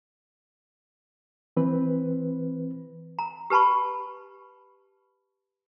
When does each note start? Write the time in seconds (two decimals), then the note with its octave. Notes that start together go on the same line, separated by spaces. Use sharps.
1.57 E3 C4 B4
3.19 A#5
3.50 G4 B4 A5 B5 C#6